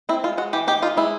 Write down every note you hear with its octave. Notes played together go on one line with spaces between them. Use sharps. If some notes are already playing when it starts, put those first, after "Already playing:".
C4 E4
G#3 F4
G#3 F#4
E3 G4
D#4 G4
D#4 F4
G#3 E4